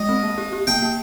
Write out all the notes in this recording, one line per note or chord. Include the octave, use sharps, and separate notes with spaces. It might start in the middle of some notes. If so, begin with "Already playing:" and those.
Already playing: G#3 D#5
C4
A#3
G4
G4
A#3 G5
A#3